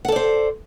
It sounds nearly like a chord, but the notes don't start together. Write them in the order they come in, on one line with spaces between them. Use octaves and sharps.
F#5 A4 D5 C5